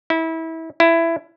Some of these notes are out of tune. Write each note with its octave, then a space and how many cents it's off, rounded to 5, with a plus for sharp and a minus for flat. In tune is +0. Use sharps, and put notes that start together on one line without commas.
E4 -25
E4 +15